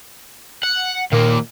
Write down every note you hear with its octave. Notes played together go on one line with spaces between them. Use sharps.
F#5
A#2 D#3 A#3